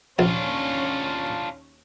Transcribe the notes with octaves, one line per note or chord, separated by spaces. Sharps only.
A#1 D#2 C#4 D4 F4